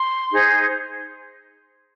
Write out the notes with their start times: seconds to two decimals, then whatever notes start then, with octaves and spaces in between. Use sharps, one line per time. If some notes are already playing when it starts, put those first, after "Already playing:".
Already playing: C6
0.31 D#4 G#4 C5